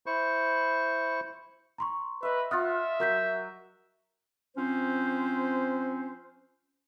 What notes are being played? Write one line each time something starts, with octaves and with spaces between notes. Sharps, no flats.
E4 C5 C#6
A#5 C6 C#6
B4 D#5 E5
F4 E5 F#5 D#6 F6 A6
F#3 A#4 G6 B6
F3 C4 C#4 C5